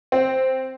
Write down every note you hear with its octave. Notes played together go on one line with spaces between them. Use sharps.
C4